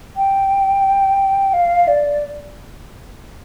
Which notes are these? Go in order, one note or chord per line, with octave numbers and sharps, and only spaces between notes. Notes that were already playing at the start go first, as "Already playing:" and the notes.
G5
F5
D5